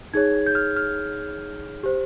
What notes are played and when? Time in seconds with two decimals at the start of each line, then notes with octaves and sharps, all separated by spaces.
0.14 D#4 G#4 C#5 G#6
0.46 G6
0.55 F6
0.76 F6
1.83 G4 C5